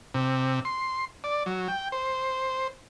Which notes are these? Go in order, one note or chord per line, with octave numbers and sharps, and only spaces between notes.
C3
C6
D5
F#3
G5
C5